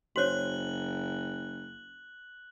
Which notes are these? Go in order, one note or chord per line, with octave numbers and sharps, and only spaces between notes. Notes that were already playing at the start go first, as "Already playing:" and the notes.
F#1 F#4 C5 C#5 F#6 F#7